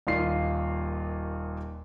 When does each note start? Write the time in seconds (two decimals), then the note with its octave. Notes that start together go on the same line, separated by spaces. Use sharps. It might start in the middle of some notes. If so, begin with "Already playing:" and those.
0.07 D#1 D#2 F4 D#5 C7